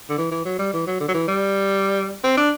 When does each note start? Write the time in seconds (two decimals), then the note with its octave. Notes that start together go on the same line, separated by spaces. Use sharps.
0.09 D3
0.18 E3
0.31 E3
0.45 F#3
0.59 G3
0.73 E3
0.87 F#3
1.00 D3
1.08 F#3
1.14 E3
1.28 G3
2.24 C4
2.37 D4